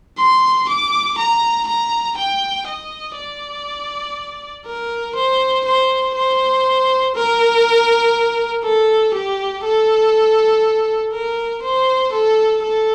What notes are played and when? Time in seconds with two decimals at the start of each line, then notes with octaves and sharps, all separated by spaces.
0.18 C6
0.68 D6
1.18 A#5
1.67 A#5
2.17 G5
2.67 D#5
3.17 D5
4.66 A#4
5.16 C5
5.66 C5
6.15 C5
7.15 A#4
8.64 A4
9.14 G4
9.64 A4
11.13 A#4
11.63 C5
12.12 A4
12.62 A4